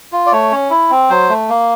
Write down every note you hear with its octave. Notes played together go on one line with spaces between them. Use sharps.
F4
D5
A3 C#5
C#4
E4
C4
F#3 C5
A3
A#3